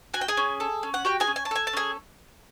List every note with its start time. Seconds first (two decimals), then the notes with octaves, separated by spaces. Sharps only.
0.14 F#4 G#5
0.21 G5
0.28 G#4 G#5
0.37 C#4
0.60 A4
0.83 C#4
0.94 F#5
1.05 F#4 G4 G5
1.20 G#4 G#5
1.27 C#4
1.36 G#5
1.45 A5
1.51 A4 G#5
1.67 A5
1.73 C#4 G#4 G#5